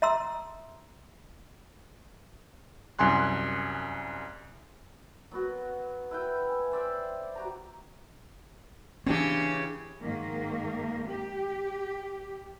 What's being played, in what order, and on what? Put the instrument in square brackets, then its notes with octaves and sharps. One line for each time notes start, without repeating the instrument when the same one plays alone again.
[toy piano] E5 A5 A#5 C6 D#6 E6
[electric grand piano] C2 F#2 G#5 C6 F#6
[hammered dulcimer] F#3 B3 F#4
E4 B4 G5
G#5
C5 D5 E5 G5
F#4 G4 A#5
[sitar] C#3 E3 G4 [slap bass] C4 D4
[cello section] G#2 D#3 A#3
G4